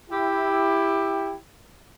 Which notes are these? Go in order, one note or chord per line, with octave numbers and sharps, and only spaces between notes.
E4 G4